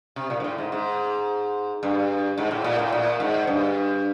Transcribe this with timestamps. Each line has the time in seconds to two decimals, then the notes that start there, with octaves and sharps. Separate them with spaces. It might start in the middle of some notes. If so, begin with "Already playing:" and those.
0.16 C3
0.30 A#2
0.40 G#2
0.44 A2
0.58 G#2
0.72 G#2
1.83 G2
2.38 G#2
2.51 A2
2.64 A#2
2.79 A2
2.92 A#2
3.20 G#2
3.47 G2